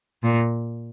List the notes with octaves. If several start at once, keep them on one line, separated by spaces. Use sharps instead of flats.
A#2